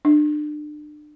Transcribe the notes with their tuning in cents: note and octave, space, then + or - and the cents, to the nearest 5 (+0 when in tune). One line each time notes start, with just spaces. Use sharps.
D4 +35